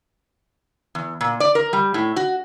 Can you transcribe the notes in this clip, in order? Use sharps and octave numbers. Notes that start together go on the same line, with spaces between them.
E2
A#2
D5
A#4
G3
A2
F#4